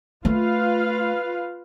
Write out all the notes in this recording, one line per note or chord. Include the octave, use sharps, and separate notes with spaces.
A3 F4 B4 F5